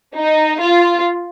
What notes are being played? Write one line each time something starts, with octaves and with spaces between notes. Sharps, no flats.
D#4
F4